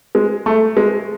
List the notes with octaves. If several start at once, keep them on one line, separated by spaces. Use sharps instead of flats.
G#3
A3
G#3